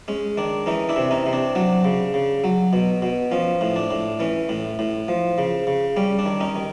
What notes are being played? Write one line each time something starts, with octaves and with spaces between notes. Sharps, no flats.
G#3 C#4
D#3 D4
E3 C#4 D#4
D4 E4
C3
C#4 D#4
C3
D4
F#3 D4
C#3
C#3
F#3
B2
B2
F3 C#4
A2
D4
A2
E3 C#4
A2
A2
F3
C#3
C#3
G3 C#4
D4
D#3
C#4 D#4
D#3